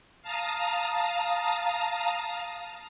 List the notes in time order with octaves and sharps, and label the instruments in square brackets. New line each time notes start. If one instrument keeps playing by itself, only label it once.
[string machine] F5 A5 A#5 D#6